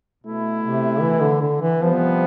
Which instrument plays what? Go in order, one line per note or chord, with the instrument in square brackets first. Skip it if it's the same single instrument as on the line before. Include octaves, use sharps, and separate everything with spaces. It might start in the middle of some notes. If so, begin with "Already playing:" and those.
[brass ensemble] B2 A3 E4
[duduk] C3
E3
D3
D3
E3
[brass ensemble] C3 G3 B3 [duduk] F3